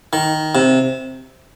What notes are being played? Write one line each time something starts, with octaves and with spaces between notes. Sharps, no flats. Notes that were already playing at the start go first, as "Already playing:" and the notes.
D#3
C3